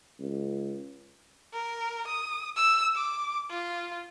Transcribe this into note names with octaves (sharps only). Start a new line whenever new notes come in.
C#2
A#4
D#6
E6
D6
F4